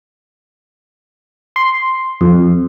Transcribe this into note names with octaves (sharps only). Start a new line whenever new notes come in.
C6
F2